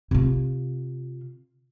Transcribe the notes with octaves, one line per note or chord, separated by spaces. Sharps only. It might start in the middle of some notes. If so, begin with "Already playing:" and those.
C3 F4